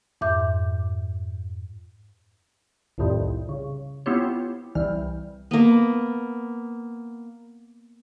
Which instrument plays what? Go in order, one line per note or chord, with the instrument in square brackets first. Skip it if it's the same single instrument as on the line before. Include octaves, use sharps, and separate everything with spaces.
[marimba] F2 G#2 E5 D6 G6
[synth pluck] C2 F2 A2 C3 D#3 G3
C#3
B3 C4 E4 F4 G4 C#5
C2 E3 G3 F6
[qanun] A#3 B3